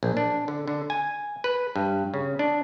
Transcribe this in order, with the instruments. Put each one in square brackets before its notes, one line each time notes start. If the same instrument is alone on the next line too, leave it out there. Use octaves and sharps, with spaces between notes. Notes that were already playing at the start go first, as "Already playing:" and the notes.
[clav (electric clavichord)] A#1
D4
D3
D3
G#5
B4
G2
C#3
D4